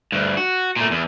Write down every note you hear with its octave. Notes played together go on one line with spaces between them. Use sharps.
D2 G2
F#4
A#2 A3
E2